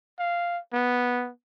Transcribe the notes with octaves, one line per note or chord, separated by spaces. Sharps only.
F5
B3